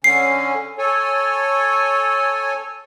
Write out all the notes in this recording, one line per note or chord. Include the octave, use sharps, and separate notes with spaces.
D3 C#4 C7
A4 C#5 G#5